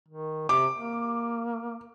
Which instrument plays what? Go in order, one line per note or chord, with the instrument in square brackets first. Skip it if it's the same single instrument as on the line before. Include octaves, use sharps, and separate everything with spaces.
[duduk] D#3
[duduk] C3 [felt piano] D6
[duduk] A#3